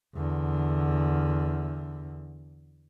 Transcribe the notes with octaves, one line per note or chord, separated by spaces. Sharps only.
E2 D3